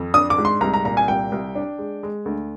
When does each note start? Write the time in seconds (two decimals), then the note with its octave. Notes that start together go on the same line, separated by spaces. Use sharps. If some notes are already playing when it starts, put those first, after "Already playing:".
Already playing: F2
0.14 D4 D#6
0.30 D6
0.38 G#2
0.45 C6
0.61 C2 A#5
0.74 A#5
0.85 A#2 A#5
0.97 G#5
1.08 C2 G5
1.32 C2
1.55 D4
1.78 G#3
2.03 G#3
2.26 D2